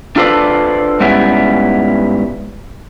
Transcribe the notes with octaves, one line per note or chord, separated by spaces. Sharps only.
D4 F4 A4 B4 C5 D5
G#2 G3 B3 C#4 E4